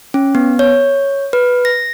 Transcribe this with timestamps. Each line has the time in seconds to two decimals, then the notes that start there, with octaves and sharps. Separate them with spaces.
0.14 C#4
0.35 B3
0.59 C#5
1.33 B4
1.65 A#6